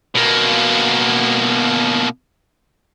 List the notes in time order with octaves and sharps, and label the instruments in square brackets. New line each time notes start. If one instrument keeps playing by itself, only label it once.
[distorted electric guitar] B2 A#3